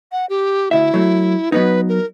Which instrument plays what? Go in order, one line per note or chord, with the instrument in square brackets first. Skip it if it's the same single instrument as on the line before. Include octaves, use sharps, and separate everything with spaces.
[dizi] F#5
G4
[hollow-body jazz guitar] D2 E5 [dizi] E4
[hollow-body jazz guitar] F#3 A3
[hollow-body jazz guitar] F#3 B3 D#4 [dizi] B4
[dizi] A#4